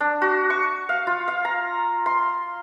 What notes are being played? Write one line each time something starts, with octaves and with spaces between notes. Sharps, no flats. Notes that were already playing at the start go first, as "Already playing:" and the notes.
D4
F#4
C#6
F5
F4
F5
A#5
C6